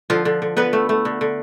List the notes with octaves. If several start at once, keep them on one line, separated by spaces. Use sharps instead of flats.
D3 F3 F4
D3
D3
D3 B3 B4
A3
A3
D3
D3